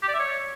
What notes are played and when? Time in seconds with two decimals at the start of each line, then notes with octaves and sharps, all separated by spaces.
0.03 G4
0.08 D5
0.14 E5
0.19 C#5